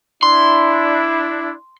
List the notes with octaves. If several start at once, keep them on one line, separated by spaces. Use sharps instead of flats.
D4 E4 C6